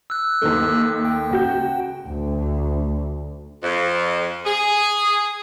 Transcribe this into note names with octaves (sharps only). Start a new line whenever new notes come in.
E6 F#6
D#2 D#3 A3
G5
C#2 F#4 G6
D2
F2
G#4